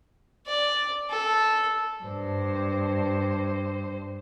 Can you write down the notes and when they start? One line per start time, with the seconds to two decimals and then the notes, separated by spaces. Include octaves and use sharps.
0.47 D5
1.10 A4
2.03 G2 C5